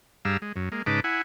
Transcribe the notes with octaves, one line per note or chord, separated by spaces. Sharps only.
G2 G3 G#4 F5 A#5 E6
G#3
F#2
G#3 A#3
G#2 C#3 D#4 B4 A5 D6
E4 F#5 G#5